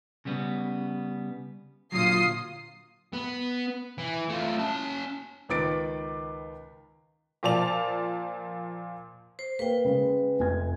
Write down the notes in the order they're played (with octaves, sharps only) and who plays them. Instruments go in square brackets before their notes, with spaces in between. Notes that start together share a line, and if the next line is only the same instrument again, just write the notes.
[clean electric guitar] C#3 G3 B3
[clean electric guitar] A#2 D3 F#3 [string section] F4 D#6 C7
[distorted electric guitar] B3
E3
A3 F4
C#4 A5
[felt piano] C#2 D#3 B4 D6 A6 D7
[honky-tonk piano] A#2 F3 D5 A5 F7
[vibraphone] C5
[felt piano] A#3 [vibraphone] B4 G5
[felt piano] C#3 G#3
F1 G#5 G#6